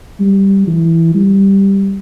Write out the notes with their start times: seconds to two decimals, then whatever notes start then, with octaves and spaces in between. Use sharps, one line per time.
0.20 G3
0.67 E3
1.15 G3